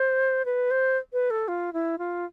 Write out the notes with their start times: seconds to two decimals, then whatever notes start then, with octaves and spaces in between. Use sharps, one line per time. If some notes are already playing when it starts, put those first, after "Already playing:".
Already playing: C5
0.45 B4
0.71 C5
1.13 B4
1.30 A4
1.48 F4
1.73 E4
1.98 F4